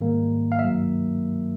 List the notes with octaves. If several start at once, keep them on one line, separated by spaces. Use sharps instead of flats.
G#2 D#3 G3 A#3
F5
G2 D#3 F#3 A#3 E5